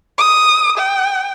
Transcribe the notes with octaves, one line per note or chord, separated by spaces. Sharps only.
D#6
G5